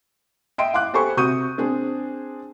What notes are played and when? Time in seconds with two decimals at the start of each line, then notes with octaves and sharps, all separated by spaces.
0.58 D#5 E5 G5 C6 D7
0.74 F5 C6 D6 F#6
0.93 G4 A4 C5 G#5 B5 C#6
1.17 C3 F#4 C#6 D#6 G6 D#7
1.58 C4 D4 G#4